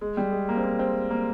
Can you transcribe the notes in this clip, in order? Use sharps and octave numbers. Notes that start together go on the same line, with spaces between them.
G#3
G3
G#3
A#3
C4
A#3
C4
A#3